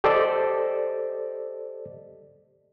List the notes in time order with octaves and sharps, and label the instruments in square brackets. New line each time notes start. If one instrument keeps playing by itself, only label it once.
[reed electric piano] G4 A4 C5 D5 D#5